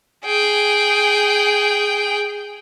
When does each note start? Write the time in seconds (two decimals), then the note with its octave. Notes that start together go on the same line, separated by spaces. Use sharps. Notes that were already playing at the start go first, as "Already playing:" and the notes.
0.25 G#4 G5